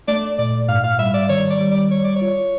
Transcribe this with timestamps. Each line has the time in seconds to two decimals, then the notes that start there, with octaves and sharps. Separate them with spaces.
0.08 A3 D5
0.39 A#2 D5
0.69 G#2 F5
0.84 F5
0.99 G3 E5
1.14 D5
1.29 D#3 C#5
1.50 D5
1.61 G3
1.71 D5
1.91 G3 C#5
2.04 D5
2.16 C#5
2.22 F4